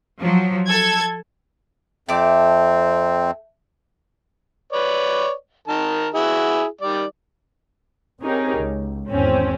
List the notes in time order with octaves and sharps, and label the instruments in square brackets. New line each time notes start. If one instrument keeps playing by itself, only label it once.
[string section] F3 F#3
A4 G#6
[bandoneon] F2 C4 [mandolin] A3 A5 D6
[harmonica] B4 C#5 D5
D#3 A#4 A5
E4 F#4 G#4
D#3 G3 D5
[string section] C4 C#4 D#4 G4 G#4 A#4
C#2
G#1 E2 C4 C#4